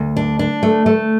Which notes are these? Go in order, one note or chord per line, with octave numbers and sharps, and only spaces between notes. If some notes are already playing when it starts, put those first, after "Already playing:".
Already playing: D2
D4
D4
A3
A3